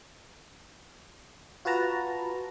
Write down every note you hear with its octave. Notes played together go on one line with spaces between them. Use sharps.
F4 F#4 B4 A5 A#5